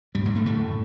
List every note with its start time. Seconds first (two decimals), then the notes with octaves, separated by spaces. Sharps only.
0.15 D2 G2 G3
0.25 G#2 G#3
0.35 A2 D3 A3
0.46 A2 A3
0.56 F#2